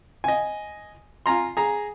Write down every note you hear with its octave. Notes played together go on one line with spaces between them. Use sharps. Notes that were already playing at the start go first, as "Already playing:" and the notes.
D#5 G#5
F4 G#5 A#5 C6
G#4 A#5